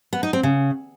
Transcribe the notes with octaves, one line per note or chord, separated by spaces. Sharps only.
B3
D#4
C4
C#3